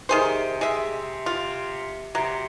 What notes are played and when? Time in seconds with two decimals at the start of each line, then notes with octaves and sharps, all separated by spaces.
0.09 C3 D#3 G#4 C5
0.61 G#3 E5
1.26 F4
2.15 C3 F#3